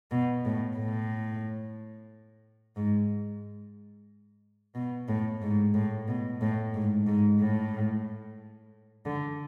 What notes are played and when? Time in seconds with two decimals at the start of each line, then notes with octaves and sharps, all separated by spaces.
0.11 B2
0.45 A2
0.77 A2
2.76 G#2
4.75 B2
5.09 A2
5.42 G#2
5.74 A2
6.08 B2
6.41 A2
6.74 G#2
7.07 G#2
7.40 A2
9.06 D3